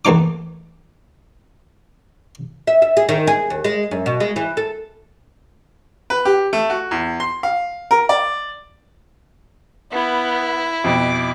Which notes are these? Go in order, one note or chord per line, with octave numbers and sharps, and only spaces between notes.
E2 E3 A3 D#4 D6
E5
E5
G#4
D#3
G#4
D#2
G#3
F#2
B2
G#3
E3
A4
B4
G4
A3
F#4
E2
C6
F5
A#4
D5
B3 E4
F2 B2 D6